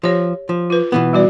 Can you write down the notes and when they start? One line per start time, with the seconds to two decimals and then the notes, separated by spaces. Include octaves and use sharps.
0.03 F3 G4 C#5
0.49 F3
0.70 F4 B4
0.92 B2 E3 B3
1.13 G3 F#4 D5